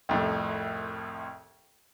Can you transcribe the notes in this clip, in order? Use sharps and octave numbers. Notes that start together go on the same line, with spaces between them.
C2 F2 A2